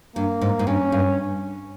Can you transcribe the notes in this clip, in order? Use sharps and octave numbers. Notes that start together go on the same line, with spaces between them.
G2 A#3
G#2
G#2
G2 C#4
G2